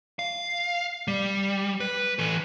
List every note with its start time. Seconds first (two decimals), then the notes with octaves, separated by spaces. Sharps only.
0.19 F5
1.08 G3
1.80 B4
2.19 E3 A4